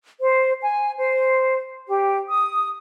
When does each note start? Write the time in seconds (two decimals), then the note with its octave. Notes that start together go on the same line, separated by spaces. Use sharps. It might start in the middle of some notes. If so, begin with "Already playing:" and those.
0.20 C5
0.62 G#5
0.98 C5
1.87 G4
2.28 D#6